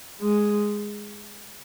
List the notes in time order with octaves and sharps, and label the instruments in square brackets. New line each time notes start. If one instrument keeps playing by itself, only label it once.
[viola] G#3